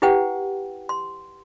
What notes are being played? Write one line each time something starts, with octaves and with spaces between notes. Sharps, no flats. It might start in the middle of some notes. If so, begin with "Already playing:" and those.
E4 G4 B4 F#5 G5
C6